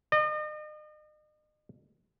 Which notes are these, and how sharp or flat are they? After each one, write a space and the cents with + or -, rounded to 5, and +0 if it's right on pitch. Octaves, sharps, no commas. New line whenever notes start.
D#5 -40